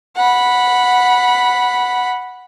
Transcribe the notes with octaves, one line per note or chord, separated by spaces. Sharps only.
F#5 B5